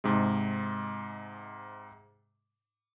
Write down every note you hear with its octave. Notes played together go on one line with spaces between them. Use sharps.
G#2 C3 G#3